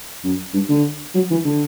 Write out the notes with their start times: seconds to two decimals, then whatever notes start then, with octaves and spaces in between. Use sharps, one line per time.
0.24 F#2
0.54 G2
0.69 D3
1.15 F#3
1.31 E3
1.45 D3